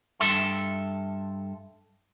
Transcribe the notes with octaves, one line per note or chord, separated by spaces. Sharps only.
G2 A4 E5 C6